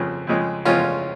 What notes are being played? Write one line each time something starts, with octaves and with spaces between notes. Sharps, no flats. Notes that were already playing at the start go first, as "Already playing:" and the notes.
Already playing: F2 C#3 F3
F2 C#3 F3 G#3
F2 C#3 F3 G#3 C#4 F4